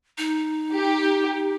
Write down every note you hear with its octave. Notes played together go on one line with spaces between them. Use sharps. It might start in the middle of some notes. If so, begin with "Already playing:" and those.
D#4
G4